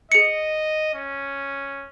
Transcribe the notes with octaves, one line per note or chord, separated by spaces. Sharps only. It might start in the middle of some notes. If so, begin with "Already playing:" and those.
G#4 D#5 C#7
C#4